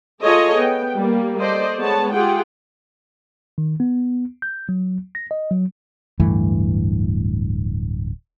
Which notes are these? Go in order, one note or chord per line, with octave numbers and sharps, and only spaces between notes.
F4 G#4 A4 C#5 D#5 A5
B3 G5
G3 A#3
A4 C5 D5 D#5
G#3 B3 C#5 A5
F4 G4 G#4 F#5 G5
D#3
B3
G6
F#3
A#6
D#5
F#3
D1 G2 E3 A3